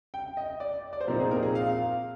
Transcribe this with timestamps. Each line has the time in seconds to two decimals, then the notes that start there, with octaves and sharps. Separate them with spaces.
0.14 G5
0.37 D#5
0.60 D5
0.93 D5
1.01 C5
1.08 A#2 F3 C4 D#4 A#4
1.20 G#4
1.31 A#4
1.43 G#4
1.55 F5